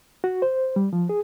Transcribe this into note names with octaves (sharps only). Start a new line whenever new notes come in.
F#4
C5
G3
F3
G#4